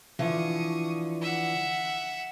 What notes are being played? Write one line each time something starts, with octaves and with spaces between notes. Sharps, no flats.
D3 E3 F3 C#6 D#6
E5 F#5